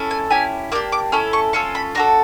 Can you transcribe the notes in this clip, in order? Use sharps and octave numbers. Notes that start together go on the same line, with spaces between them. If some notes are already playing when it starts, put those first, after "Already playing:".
Already playing: C#4 E4 A4
G#5
C#4 E4 G4 G#5
A#3 D4 G4 D6
D6
C#4 E4 A4 C#6
C#6
C#4 F4 A4 C#6
B5
D4 F#4 A4 A#5